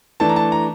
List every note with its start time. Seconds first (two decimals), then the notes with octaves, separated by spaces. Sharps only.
0.20 E3 A3 D4 A5
0.29 A#5
0.36 A5
0.52 A#5